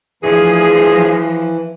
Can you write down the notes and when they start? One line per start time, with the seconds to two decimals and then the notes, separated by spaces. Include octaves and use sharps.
0.23 E3 F3 A3 D4 G#4